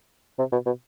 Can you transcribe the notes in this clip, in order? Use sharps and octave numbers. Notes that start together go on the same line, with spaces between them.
C3
B2
B2